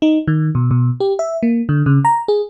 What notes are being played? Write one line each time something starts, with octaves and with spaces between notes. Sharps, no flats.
D#4
D#3
B2
B2
G4
E5
A#3
D3
C#3
A#5
G#4